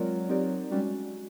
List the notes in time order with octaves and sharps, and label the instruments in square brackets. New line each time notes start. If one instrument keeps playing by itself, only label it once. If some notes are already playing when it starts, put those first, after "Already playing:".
Already playing: [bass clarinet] F#3 [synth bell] G#3 C4 F4 A#4 D5
[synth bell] C4 D#4 G4 A#4 D5
[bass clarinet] G3 [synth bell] G#3 C#4 F#4